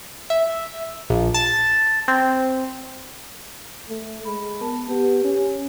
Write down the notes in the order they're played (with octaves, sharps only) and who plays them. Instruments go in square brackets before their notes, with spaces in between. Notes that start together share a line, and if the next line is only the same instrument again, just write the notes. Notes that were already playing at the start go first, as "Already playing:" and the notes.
[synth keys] E5
A#1
A5
C4
[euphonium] A3
[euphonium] G#3 [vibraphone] B5
[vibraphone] B3 A#4 A5
[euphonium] B3 [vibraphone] G4
[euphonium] C#4